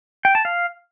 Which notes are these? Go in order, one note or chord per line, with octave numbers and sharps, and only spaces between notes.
G5
A5
F5